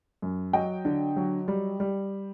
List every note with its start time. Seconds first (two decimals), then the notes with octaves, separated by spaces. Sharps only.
0.22 F#2
0.53 F#3 D#5 G5
0.85 D3
1.16 F#3
1.48 G3
1.80 G3